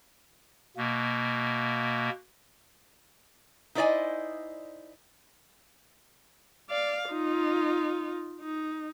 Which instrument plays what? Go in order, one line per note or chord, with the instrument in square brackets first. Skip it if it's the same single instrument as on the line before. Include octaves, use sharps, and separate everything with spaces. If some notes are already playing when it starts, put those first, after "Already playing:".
[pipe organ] B2 A#3
[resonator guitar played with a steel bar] D#4 E4 C5 D5 D#5 G#5
[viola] D5 F5
D#4 F4
D#4